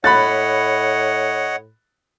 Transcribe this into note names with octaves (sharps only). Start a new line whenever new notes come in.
A2 C#5 D#5 F#5 B5 F#6 A6